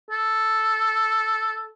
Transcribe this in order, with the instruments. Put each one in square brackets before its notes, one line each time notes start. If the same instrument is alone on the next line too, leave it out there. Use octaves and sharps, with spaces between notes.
[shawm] A4